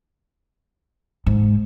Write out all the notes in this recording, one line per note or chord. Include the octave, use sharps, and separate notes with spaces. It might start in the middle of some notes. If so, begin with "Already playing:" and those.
G#2